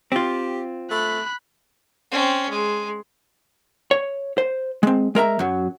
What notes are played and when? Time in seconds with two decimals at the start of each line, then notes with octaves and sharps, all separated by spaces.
0.12 C4 F4 G4
0.91 A3 B5 F#6
2.12 C4 C#4
2.49 G#3
3.91 C#5
4.38 C5
4.83 G#3 C4
5.15 G#3 A#4 E5 A#5
5.39 F#2 F#3